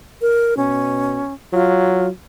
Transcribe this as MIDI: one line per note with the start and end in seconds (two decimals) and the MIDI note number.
0.21 0.54 70
0.57 1.21 47
0.57 1.33 61
1.53 2.08 54
1.53 2.09 65